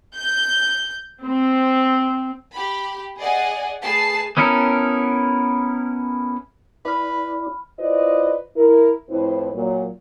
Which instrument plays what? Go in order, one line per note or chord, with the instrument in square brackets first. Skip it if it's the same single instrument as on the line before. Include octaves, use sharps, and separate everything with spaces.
[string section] G6
C4
[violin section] G4 B5
G#4 D5 D#5 F#5 G#5
A3 G#4 B4 A5 C7
[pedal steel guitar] B3 C#4 E4 A4 A#4
[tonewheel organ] E4 D5 [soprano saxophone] B4 [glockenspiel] B5 F6
[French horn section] E4 F4 B4 C5 D5 D#5
E4 A#4
F2 A2 E4 B4 C5
A#2 F#3